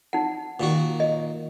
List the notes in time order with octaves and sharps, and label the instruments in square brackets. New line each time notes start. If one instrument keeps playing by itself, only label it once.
[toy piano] D#4 F#5
[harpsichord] A#2 D#3 F#4
[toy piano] D#5